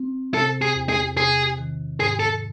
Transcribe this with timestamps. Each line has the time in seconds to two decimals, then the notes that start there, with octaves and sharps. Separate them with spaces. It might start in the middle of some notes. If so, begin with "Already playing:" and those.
Already playing: C4
0.34 C3 A4
0.62 G#4
0.75 E2
0.89 G#4
1.17 C3 G#4
1.58 D#3
1.99 G#2 G#4
2.20 A4